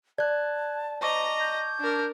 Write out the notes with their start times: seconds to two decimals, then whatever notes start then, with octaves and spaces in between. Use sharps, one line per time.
0.18 D5 A5 F#6 G#6
1.02 C5 D#5 A5 A#5 C#6 D6
1.40 G6
1.81 D4 A#4